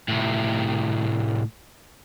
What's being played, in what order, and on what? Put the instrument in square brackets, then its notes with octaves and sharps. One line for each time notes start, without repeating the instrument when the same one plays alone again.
[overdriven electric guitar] A2 C3